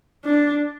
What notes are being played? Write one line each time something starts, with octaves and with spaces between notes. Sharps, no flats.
D4